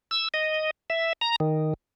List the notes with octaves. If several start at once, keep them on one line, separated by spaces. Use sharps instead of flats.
E6
D#5
E5
A#5
D#3